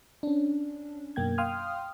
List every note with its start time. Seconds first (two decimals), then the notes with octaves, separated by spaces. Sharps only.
0.23 C#4 D4
1.16 F#2 B2 A#3 G5 G#6
1.38 F5 G5 C6 D#6 F6